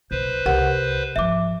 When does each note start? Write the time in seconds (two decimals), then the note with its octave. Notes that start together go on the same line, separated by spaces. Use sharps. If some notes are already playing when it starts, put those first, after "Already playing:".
0.11 B1 B4 C5
0.46 C2 G4 A#4 F#5
1.16 G#2 F3 E5 D6